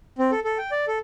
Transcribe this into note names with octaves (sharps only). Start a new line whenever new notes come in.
C4
A4
A4
G5
D5
A4